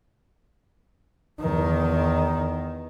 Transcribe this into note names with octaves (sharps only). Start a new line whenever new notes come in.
E2 D#3